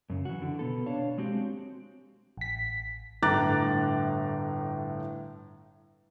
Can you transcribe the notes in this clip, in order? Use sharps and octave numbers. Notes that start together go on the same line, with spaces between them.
F#2 C#3
E3 F#4
D3
B2 B3 A4
D4 C#5 F5 A5
G#3 C4 F#4 G4
A1 B6
G1 A2 A#5 D6 F#6 A6